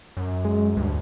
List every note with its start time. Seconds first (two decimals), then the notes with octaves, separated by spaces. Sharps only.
0.17 F#2
0.45 G#3
0.77 D2 G2